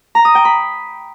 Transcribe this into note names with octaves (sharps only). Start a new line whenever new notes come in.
A#5
D#6
G5
B5